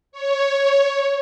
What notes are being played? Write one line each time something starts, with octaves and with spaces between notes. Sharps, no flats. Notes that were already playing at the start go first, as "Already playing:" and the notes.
C#5